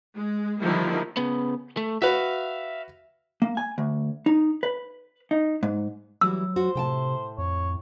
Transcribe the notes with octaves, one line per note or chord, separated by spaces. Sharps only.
G#3
D3 D#3 F3 G3 A#3 E4
C#3 B3
A3
F#4 B4 E5 F5
A#3
G#5
D2
D#4
B4
D#4
G#2
E3 F#3 G3 F#4 E6
F#4 C5
A2 C3 G5 A5
F2 C#5